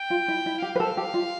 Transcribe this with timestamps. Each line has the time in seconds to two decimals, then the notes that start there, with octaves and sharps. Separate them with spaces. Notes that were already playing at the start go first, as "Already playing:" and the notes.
Already playing: G5
0.10 F4
0.28 E4
0.46 E4
0.62 G4 F5
0.75 B4
0.80 A4
0.97 G4
1.14 F4